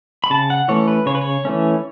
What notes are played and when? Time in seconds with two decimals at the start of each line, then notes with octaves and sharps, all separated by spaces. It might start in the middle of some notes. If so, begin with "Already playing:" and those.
0.24 B5
0.30 C#3 A5
0.50 F#5
0.68 E3 A3 C#4 C#5
0.88 B4
1.06 C#3 C#5
1.15 B4
1.21 C#5
1.45 E3 A3 C#4